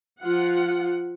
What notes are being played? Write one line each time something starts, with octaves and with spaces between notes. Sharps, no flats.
F3 F4 F#5